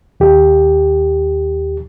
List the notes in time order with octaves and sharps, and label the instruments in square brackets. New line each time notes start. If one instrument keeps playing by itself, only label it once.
[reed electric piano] D#2 G4